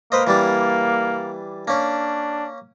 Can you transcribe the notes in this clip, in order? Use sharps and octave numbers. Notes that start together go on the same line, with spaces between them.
A#3 B4 C5 D#5
E3 G3 D4
A#3 C#4 D4